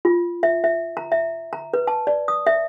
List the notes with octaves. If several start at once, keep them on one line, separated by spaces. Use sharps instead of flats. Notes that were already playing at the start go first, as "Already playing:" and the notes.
F4
E5
E5
A#5
E5
A#5
B4
A5
D5
D#6
E5